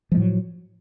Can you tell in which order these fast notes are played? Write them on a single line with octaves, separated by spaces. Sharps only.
F3 G#3 A2 F#3